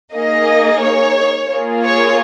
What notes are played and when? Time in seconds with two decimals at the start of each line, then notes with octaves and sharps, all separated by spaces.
0.14 A#3 D#4 G#4 D#5
0.81 C#5
1.50 A#3 F4 G#4
1.84 C#5